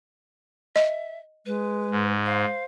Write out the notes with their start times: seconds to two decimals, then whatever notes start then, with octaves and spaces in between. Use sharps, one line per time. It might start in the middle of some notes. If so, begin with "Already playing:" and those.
0.76 D#5 E5
1.46 G#3 B4
1.91 G#2
2.26 C5 F5